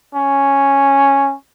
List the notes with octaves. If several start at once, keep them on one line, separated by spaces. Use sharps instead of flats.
C#4